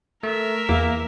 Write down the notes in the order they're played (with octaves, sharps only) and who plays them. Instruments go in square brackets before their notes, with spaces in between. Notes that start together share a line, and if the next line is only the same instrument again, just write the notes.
[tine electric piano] A3 [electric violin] A#4 E5
[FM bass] E2 [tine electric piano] E3 [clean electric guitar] A#3